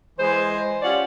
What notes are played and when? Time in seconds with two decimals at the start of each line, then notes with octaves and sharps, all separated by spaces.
0.19 E3 G#3 C5
0.82 C#4 F4 G4 C#5 D5 F#5